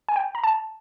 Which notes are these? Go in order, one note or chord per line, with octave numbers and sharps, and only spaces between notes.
G#5
G5
A#5
A5